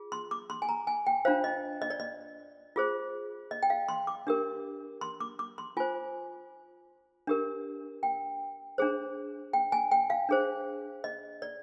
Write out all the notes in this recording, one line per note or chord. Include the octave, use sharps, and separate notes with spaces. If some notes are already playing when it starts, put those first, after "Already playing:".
Already playing: F4 G#4
C6
D6
C6
G#5
A#5
G#5
G5
D4 F4 C5 F5
D#5
D#5
D5
D#5
F4 G#4 C5
D#5
G5
F5
C6
D6
D4 G4 A#4
C6
D6
D6
C6
F4 C5 G#5
D4 G4 A#4
G5
D4 G#4 C5
G5
G#5
G5
F5
D4 G#4 C5
D#5
D5